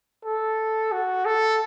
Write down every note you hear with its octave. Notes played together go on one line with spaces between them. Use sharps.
A4
F#4
A4